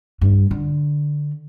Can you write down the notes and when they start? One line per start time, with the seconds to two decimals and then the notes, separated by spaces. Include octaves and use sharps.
0.21 G2
0.51 D3